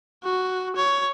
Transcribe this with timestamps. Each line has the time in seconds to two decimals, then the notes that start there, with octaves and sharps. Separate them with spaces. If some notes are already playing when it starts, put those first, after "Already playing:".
0.23 F#4
0.76 C#5